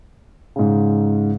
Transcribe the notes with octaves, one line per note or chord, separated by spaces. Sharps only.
G#2 C#3